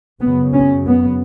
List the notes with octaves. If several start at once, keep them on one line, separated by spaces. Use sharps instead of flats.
F#2 C#3 B3
C#4
B3